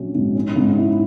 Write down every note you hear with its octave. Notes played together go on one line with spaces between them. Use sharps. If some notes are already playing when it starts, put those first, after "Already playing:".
Already playing: A#1 F#3 C#4
G#2
C#4
G#2
E4